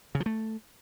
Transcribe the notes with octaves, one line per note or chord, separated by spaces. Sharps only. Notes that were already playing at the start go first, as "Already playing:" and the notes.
C#3
F3
A3